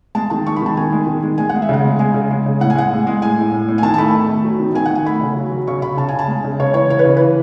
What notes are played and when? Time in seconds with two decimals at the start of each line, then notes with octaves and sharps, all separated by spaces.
0.15 G#3 A5
0.30 D#3 A5
0.46 G#3 C#6
0.56 B5
0.62 D#3 A5
0.77 D#3 G#5
0.92 G#3
1.07 D#3
1.23 G#3
1.38 G#3 G#5
1.49 G#3 F#5
1.62 E5
1.69 C#3 F#5
1.84 G#3
1.99 G#3 G#5
2.14 C#3
2.31 G#3
2.46 C#3
2.60 A2 F#5
2.70 G#5
2.75 G#3 F#5
2.91 A2
3.07 G#3
3.21 A2 G#5
3.38 A2
3.52 A2
3.68 A2
3.78 G#5
3.83 D#3 A5
3.94 A5
3.98 A3 B5
4.14 A3
4.29 A3
4.44 F#3
4.60 D#3
4.75 D#3 G#5
4.86 F#5
4.91 D#3 G#5
5.06 A3 B5
5.21 C#3
5.37 F#3
5.51 F#3
5.67 C#3 C#6
5.82 C#3 B5
5.97 C#3 A5
6.09 G#5
6.14 C#3
6.19 A5
6.28 G#3
6.44 C#3
6.60 C#3 C#5
6.74 E3 C#5
6.89 E3 C#5
6.99 B4
7.05 C#3
7.17 E3 B4